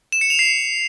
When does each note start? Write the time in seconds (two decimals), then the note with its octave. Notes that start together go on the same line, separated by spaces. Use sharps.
0.12 E7
0.21 C#7
0.30 F7
0.39 C7